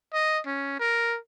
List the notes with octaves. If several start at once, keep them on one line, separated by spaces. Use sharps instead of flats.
D#5
C#4
A#4